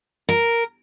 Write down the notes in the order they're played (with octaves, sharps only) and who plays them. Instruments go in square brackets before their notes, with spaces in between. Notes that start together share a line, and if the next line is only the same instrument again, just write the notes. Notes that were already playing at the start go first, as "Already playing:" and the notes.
[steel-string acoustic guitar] A#4